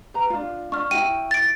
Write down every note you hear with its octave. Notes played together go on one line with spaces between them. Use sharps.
B4 A#5
D4 F4
D4 C#6 F6
E4 F#4 G5 D#7
A6 D7